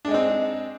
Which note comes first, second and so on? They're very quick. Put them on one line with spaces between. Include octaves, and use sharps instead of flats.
D4 G#3 D#4 C4